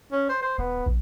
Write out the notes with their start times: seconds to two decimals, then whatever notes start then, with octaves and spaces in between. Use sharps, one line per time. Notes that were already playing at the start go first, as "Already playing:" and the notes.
0.12 C#4
0.29 C5
0.42 C5
0.58 D#1 B3
0.86 A#1